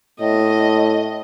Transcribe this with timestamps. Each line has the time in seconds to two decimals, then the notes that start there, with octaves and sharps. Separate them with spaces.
0.21 A2 D#5